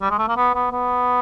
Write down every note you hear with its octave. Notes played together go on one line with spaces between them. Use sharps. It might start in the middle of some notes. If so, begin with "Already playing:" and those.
G3
G#3
A3
A#3
B3
B3
B3